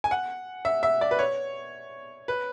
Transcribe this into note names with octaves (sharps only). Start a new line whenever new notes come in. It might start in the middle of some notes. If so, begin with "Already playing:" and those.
G#5
F#5
E5
E5
D5
B4
C#5
B4